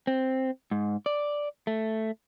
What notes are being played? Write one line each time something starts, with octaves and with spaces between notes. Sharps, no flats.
C4
G#2
D5
A3